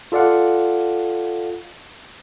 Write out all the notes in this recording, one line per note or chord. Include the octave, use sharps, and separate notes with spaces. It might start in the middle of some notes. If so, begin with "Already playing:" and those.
F4 A4 D5 F5 F#5